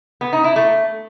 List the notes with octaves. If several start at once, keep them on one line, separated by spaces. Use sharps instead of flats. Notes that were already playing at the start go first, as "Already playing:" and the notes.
B3
D#4
E4
A3